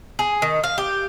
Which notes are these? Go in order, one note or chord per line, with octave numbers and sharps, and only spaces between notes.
G#4
D#3
F5
G4